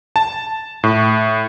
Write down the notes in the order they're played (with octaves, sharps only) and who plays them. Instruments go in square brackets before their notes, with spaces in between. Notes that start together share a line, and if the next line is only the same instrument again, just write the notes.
[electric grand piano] A5
A2